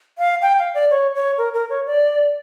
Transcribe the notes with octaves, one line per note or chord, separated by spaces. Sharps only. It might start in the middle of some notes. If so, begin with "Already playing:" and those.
F5
G5
F5
D5
C#5
C#5
A#4
A#4
C#5
D5